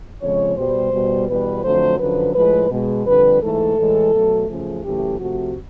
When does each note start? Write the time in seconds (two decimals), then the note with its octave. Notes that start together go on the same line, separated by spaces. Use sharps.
0.21 F2 C#3 F3 G#3 C#5
0.57 B2 G3 C5
0.92 B2 G3
1.28 E2 B2 G3 B4
1.64 F2 D3 F#3 A3 C5
1.99 F#2 D3 F3 B4
2.35 A2 F3 G#3 B4
2.70 B2 G#3
3.06 F2 D3 G3 B4
3.42 G#2 E3 A3 A4
3.78 A2 E3 G#3
4.13 B2 F#3 A3
4.48 F#2 C#3 F3 A3 G#4
4.84 F#2 C#3 E3 A3 G4
5.19 C3 F3 A3 F#4